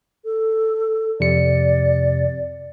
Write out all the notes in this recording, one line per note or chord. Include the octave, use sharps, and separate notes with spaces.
A4
F2 C3 D5 C#7